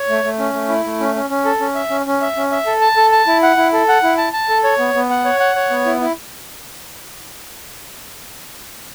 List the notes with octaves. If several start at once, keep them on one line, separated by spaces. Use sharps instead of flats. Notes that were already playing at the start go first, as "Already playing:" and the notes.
Already playing: C#5
A3
A3
C#4
A3
E4
A3
C#4
C#4
C#4
A4
C#4
E5
C#4
C#4
E5
C#4
E5
A4
A5
A4
A5
E4
F#5
E4
A4
F#5
E4
A5
A5
A4
C#5
B3
B3
F#5
C#5
F#5
C#5
B3
E4
E4